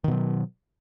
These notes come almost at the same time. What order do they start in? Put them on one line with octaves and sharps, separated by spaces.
D#3 B2 F#3